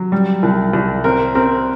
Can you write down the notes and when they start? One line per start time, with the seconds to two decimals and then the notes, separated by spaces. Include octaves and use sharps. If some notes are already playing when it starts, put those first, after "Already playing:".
Already playing: F#3
0.12 G3
0.43 C2
0.73 C2
1.04 C4 A#4
1.35 C4 A#4